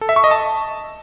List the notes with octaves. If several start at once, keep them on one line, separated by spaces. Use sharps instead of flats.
A4
E5
C#6
D#5
A5